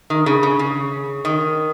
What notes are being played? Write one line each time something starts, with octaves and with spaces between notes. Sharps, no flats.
D#3
C#3
C#3
C#3
D#3